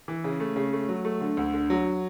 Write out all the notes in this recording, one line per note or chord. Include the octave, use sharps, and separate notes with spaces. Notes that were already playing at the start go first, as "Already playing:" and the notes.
E3
C#3
A3
C#3
A3
F#3
A3
D3
D2
D3
F#3